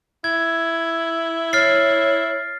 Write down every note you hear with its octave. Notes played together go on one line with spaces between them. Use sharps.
E4 G#6
C#5 F6 A6 C7